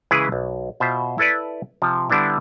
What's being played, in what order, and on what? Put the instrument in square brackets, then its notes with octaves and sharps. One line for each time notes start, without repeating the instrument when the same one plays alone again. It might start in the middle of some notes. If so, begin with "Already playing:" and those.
[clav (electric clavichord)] C#3 E3 G#3 E4 G#4 B4
B1
B2 F4 C5 E5
E4 A4 B4 D5
C3 F3
D3 G3 B3 D4 E4